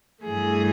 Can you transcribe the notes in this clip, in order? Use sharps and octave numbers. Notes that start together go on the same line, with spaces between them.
G2 E3 A3 G#4